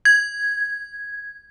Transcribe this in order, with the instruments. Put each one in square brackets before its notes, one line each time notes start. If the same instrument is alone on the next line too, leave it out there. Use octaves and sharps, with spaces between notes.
[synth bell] G#6